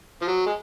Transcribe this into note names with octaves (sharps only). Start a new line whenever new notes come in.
F3
F#3
G#3